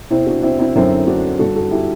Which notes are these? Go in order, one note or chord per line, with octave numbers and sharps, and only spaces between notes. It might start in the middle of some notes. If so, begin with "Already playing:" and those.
E2 C3 E3 C4 E4
D4 F#4
C4 E4
C4 E4
F#2 D3 C4 E4
D4 F#4
G2 D3 F#4 A4
F#4 A4
E4 G4